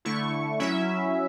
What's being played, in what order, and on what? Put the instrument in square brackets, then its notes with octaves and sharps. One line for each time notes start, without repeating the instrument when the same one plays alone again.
[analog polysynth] D3 A3 E4 C#6
F#3 C#4 E4 E5